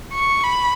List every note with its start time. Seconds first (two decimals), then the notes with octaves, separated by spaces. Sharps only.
0.13 C#6
0.44 B5